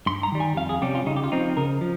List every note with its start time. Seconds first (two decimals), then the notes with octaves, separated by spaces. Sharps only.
0.06 G2 C6
0.23 A#5
0.32 D#3 G3
0.40 G#5
0.57 F2 F5
0.69 G#4
0.82 C3 G3 C#4 G4
0.95 F4
1.06 C#3 D#4
1.16 G4
1.24 F4
1.32 F3 C4 D#4
1.57 C#3 A#4
1.81 F3